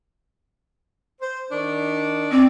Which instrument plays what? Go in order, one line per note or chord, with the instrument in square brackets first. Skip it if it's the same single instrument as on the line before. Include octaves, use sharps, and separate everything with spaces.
[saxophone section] C5
D#3 D4
[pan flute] C4 [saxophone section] D5